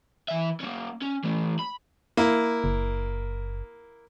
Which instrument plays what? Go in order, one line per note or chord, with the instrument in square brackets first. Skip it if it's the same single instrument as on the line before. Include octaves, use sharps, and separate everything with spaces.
[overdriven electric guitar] E3 E5
A#3 C#4
C#4
E3 A3
B5
[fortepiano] A#3 E4
[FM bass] F#1